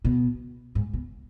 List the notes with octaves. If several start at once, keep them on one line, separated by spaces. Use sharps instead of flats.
B2
G#2
B2